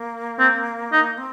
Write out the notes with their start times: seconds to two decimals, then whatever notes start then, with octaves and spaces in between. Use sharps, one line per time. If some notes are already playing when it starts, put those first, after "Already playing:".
Already playing: A#3
0.39 C4
0.92 D#4
1.18 C4